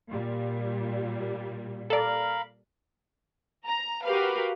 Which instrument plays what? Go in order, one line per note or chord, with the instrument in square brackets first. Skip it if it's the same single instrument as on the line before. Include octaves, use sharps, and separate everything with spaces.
[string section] A#2 G3
[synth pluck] A4 D5 [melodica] A#4 F5 B5
[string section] A#5
F#4 G4 A#4 B4 F5